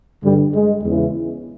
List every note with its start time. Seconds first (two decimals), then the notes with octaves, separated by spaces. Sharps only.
0.22 G2 D3 G3
0.54 G#3
0.84 E2 C#3 E3